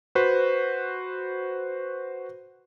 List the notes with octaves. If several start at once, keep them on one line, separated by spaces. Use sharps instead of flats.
F#4 B4 C5